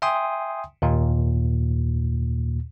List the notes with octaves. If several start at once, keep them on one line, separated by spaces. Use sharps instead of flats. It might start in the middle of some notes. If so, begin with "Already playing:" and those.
E5 G5 G#5 C6 D#6
D#2 A#2